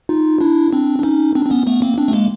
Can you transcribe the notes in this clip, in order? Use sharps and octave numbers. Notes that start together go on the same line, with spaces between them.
D#4 F4
D4 E4
C4 D4
D4
C#4 D#4
C4 D4
C4
B3 C#4
A3 B3
A#3 C4
C4 D4
A3
G#3 A#3